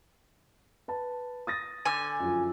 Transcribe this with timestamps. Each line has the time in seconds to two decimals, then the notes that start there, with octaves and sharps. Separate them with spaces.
0.88 B4 A5
1.47 D#6 A6 A#6
1.85 D3 G#5
2.20 F#2 F3